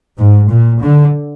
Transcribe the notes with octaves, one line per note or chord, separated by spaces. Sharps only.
G#2
A#2
D3